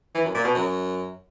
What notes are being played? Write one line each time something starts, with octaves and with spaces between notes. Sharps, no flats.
E3
F#2
A#2
B2
F#2